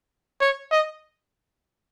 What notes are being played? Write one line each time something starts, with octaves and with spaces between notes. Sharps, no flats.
C#5
D#5